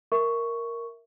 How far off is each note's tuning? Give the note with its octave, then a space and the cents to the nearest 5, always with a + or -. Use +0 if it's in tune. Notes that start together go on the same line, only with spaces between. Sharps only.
A#4 +0 E5 -10 C#6 +5